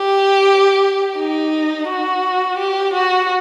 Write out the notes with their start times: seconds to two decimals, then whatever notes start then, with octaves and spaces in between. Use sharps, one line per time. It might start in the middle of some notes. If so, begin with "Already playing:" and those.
Already playing: G4
1.18 D#4
1.88 F#4
2.58 G4
2.93 F#4